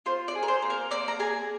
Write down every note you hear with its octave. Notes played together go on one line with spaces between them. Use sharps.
F4 C5
D5
G#4
A#4
C5
A#3
A#4
A#3 D5
A#5
G#4 G#5